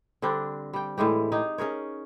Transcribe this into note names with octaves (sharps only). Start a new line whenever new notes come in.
D3 G3 C4 D4
G3 G5
A2 E3 G#3 G4
D#4 G4 G#4 D#5
C#4 G#4 A#4 C#5